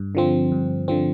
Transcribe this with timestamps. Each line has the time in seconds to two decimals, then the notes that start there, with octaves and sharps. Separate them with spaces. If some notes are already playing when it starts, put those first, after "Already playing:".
Already playing: G2
0.15 D3 F3 C4
0.52 G2
0.88 D3 F3 C4